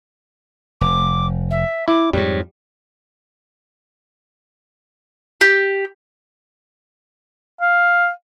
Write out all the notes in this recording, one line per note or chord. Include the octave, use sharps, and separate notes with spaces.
F1 D6
E5
E4 D6
F2 G#2 G3 C#5
G4
F5